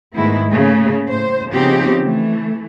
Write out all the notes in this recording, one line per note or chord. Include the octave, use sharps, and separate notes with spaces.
G#2 D#3 G#3 A3 B3 E4
C#3 A3 A#3
A2 C5
C#3 F3 B3 C4 D#4 G4
E3 A3